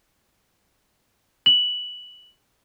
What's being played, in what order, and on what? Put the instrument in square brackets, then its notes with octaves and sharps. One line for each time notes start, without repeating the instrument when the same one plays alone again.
[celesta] F#7